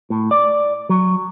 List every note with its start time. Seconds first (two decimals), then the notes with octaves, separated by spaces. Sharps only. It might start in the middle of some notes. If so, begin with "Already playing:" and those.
0.10 A2
0.31 D5
0.89 F#3